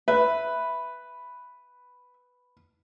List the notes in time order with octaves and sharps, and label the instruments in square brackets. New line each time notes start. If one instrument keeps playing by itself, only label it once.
[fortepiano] B4 [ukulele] E5